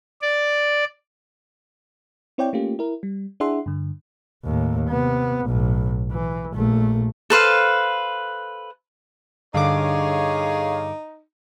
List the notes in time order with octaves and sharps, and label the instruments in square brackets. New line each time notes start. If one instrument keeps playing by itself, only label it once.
[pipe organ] D5
[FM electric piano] C4 E4 C#5 D5 G5
A3 A#3 C#4 F4 G4
E4 A#4
G3
D4 E4 G#4 E5 F#5 C6
G2 D3
[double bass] D#2 A2
C3 B3
B1 A2
E3
A#1 A3
[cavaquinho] A4 B4 C5 F5
[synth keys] G2 D3 D6 [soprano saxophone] D#4 [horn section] G#4 C#5 [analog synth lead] F5